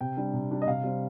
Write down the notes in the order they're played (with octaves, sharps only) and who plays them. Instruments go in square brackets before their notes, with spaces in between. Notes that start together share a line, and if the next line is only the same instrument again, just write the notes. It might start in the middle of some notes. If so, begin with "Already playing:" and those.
[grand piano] C3 G5
G3 D4
C3
G3 D4
D#5
C3 F5
G3 C4